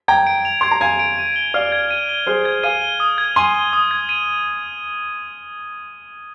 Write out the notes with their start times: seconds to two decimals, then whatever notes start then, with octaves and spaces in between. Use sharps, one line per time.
0.08 G5 A#5 G#6
0.27 D7
0.45 F7
0.61 C6 G#6
0.71 A#5
0.81 F5 G#5 G#6
0.99 D7
1.18 D#7
1.36 G7
1.54 D5 F5 F6
1.72 G#6
1.91 D#7
2.09 G7
2.27 G#4 C5 F6
2.45 G#6
2.63 F5 G#5 D#7
2.82 G7
3.00 D#6
3.18 G#6
3.36 G#5 C6 D#7
3.55 G7
3.73 D#6
3.91 G#6
4.09 D#7